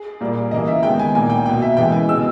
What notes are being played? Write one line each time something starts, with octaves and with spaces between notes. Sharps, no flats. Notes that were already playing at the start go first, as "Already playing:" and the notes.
Already playing: G#4
A#2 G3 A#3
C#3 E3 A#3 D#5
E5
D#3 G#3 B3 G5
G#5
A#2 A#3 G#5
G5
B2 A#3 G5
E5
C#3 E3 G#3 G5
G#5
B2 G#3 B3 E6